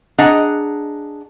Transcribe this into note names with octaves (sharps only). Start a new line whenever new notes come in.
D4 G#4 D#5 F#5 A#5